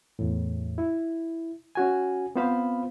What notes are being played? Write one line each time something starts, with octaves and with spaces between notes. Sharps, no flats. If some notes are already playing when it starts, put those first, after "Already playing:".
E2 A2
E4
C#4 F#4 G#5
B3 C4 F4 C5 F5 B5